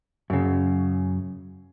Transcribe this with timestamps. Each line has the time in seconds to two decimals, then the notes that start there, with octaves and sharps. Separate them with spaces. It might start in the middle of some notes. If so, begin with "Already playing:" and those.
0.30 F#2 C#3